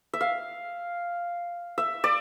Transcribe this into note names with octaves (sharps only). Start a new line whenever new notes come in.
E5
F5
E5
D5